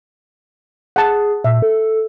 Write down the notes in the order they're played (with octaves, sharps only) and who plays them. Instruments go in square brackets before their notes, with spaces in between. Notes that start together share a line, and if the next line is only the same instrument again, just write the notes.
[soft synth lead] G#4 [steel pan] F#5 A5
[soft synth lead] A#2 [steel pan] E5
[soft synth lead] A4